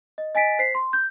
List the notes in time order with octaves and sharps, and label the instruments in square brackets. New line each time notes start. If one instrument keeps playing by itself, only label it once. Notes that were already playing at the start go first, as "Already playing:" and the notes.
[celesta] D#5
D#5 G#5 A6 B6 D7
C5 B6 C7
C6
G6